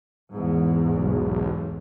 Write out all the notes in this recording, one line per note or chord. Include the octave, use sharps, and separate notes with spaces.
E2 G#2
B1